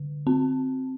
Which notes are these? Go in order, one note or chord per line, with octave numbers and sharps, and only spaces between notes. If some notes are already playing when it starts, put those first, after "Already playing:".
Already playing: D3
C4